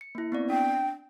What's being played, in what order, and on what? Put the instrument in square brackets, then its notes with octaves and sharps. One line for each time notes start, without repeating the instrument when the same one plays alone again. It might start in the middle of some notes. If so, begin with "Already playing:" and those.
[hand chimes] C#7
A#3 E4
B3 C4 D5
[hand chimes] D4 [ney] G5